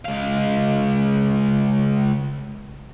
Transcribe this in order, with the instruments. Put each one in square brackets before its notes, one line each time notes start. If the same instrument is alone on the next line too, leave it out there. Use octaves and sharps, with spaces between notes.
[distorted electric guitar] C#2 F5